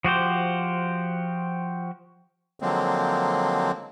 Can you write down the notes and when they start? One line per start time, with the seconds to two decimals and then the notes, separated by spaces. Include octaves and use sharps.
0.05 F3 F#4 G4 C5
2.60 D3 F3 F#3 G#3 A#3 C4